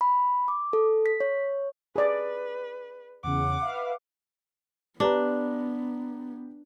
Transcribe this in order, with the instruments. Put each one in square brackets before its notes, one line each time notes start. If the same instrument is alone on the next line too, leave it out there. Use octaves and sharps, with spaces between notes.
[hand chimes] B5
D6
A4
B6
C#5
[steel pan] G#4 D5 [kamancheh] B4
[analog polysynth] E2 C#3 [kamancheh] F#5 D6
[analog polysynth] B4 E5 F5
[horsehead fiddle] B3 [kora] D4 [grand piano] G4 B4 A#5